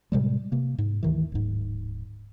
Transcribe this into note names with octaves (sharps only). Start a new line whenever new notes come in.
A2 C3 G3 G#3
C3 A#3
G#2
D2 D#3 E3
D1 G#2